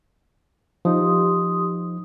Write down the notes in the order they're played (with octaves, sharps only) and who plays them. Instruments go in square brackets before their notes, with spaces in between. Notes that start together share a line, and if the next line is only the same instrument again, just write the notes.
[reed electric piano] F3 D#4 [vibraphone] G4 C6 D#6